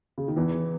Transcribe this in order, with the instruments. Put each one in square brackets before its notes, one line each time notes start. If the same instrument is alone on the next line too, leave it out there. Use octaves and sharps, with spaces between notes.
[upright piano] C#3
D#3
E2 E3